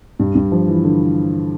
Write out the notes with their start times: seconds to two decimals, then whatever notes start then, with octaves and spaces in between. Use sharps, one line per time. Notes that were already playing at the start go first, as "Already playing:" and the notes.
0.19 G2
0.35 G2
0.52 F3
0.68 E3
0.84 D3